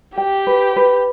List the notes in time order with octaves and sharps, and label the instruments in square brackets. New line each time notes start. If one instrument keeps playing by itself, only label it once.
[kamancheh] G4 [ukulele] G5
[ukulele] B4
B4